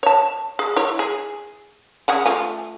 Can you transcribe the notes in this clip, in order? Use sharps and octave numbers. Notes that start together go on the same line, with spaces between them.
C#5 A5
G#4
E4 C#5
G#4
C#3 G#4 F#5
A3 F4 G#5